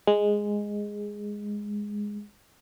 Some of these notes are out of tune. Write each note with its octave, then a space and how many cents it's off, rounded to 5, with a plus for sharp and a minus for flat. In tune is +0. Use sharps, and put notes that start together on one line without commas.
G#3 -5